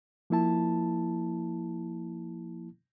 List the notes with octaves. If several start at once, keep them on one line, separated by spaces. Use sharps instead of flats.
F3 A#3 E4 A5